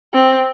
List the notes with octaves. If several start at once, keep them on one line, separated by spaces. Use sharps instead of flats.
C4